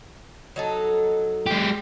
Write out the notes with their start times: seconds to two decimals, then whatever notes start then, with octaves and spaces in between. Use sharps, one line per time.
0.56 F#3 D#4 A4
1.46 G#3 G4